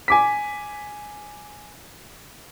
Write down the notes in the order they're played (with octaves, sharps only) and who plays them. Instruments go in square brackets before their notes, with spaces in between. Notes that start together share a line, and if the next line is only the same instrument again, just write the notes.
[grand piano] G#5 D6 B6